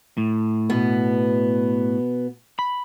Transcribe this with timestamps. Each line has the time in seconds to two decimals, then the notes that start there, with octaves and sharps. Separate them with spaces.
0.18 A2
0.70 B2 B3
2.59 B5